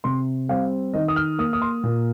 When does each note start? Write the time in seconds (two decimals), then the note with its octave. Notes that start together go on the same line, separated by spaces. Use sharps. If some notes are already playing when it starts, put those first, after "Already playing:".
0.04 C3 C6
0.49 G3 C4 F5
0.94 D#3 D#5
1.08 D#6
1.16 F6
1.38 A#3 D#6
1.53 D#6
1.62 C6
1.83 A#2